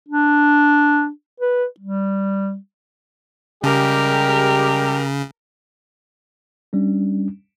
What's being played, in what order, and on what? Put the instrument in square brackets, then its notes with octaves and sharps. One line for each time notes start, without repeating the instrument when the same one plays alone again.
[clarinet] D4
B4
G3
[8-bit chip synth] C#3 [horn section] G3 G#3 G4 [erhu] A#4
[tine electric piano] G3 C#4 D4